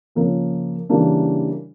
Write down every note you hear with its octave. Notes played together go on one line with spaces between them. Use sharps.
C#3 F3 A#3 C#4
C#3 E3 G3 A#3 D4